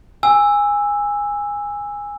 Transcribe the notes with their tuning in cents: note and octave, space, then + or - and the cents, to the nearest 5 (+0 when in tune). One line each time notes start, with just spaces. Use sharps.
G#5 -15 E6 +0